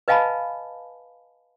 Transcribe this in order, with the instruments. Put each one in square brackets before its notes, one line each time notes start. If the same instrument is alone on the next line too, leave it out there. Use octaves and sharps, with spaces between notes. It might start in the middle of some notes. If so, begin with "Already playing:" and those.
[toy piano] B4 D#5 F5 G#5 A5 B5